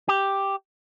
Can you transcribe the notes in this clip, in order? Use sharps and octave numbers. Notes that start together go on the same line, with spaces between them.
G4